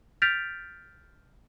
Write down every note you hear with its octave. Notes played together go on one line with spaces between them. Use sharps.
F6 G6 A6 B6 D7 F7